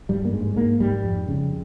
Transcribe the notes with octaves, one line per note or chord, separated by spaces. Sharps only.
G2 G3
A#3
G#2 G#3
G#2 A#3
G#2 G3
F2
C#3